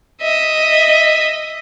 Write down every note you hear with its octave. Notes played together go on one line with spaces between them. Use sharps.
D#5 E5